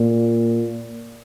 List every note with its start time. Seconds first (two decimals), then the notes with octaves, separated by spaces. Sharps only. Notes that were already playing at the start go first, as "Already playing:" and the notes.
Already playing: A#2